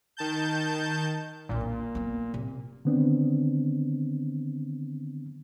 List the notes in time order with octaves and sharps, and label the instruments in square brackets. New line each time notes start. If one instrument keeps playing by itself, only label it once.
[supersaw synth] D#3 A5 G6
[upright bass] A#1 E2 [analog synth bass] A#2
[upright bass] D4
A#3 B3
C3
[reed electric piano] D3 D#3 B3 C4 D4